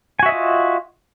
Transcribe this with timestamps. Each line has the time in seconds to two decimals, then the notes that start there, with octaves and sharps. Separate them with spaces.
0.19 G#5
0.23 F#4
0.26 E5
0.29 D#5
0.32 F4